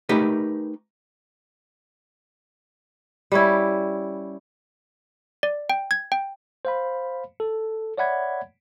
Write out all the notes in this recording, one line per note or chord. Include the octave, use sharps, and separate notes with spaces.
A3 D#4 G4 A#4 B4
G3 C#4 E4
D5
G5
G#6
G5
C5 F5 B5
A4
C#5 D5 E5 F#5 B5 G#6